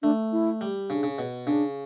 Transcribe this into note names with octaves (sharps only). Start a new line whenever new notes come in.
A3 D4
E4
G3
C#3 D4
C#3
B2
C#3 D4